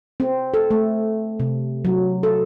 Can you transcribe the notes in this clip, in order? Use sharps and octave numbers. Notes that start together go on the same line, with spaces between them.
C4
A4
A3
C3
F#3
A4